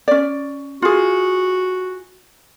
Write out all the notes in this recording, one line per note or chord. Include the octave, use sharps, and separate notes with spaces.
C#4 D5
F4 F#4 G#4